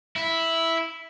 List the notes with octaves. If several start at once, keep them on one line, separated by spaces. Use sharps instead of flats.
E4